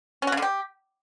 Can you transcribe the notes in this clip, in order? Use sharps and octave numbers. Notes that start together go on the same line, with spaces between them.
C#4
F#4
C#3
D3
G4